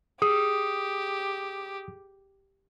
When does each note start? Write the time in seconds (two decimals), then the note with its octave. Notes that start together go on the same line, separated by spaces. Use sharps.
0.22 G4 G#4 D#6